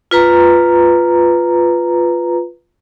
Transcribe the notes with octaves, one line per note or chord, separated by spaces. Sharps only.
F4 B4 A#5